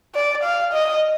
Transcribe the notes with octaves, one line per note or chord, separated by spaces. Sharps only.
D5
F5
D#5